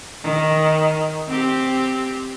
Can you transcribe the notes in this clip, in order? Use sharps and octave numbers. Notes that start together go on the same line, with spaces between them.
D#3
C4 G4